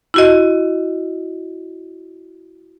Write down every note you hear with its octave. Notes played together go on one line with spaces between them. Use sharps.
E4 F#4 D#5